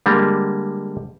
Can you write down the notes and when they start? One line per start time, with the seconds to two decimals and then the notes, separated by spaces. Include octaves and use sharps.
0.06 D3 G3 G#3 A#3